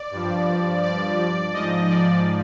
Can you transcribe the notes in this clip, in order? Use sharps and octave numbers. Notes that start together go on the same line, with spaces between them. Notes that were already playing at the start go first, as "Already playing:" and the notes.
Already playing: D5
G2 F3
D5
G#2 F3 D#5
D5